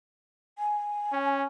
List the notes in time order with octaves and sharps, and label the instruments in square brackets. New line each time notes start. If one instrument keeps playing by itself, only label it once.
[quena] G#5
[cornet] C#4